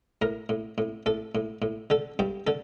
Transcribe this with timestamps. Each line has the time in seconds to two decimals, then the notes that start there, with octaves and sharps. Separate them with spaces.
0.22 A2 A#4
0.49 A2
0.78 A2
1.06 A2 A4
1.35 A2
1.62 A2
1.90 D3 A4
2.19 G2 G4
2.47 D3 A4